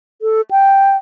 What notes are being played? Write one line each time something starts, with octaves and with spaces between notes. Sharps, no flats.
A4
G5